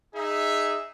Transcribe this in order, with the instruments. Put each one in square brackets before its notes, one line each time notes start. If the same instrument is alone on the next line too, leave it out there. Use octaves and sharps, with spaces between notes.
[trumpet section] D#4 G#4 E5